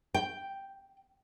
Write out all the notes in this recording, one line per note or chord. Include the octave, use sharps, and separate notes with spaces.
G5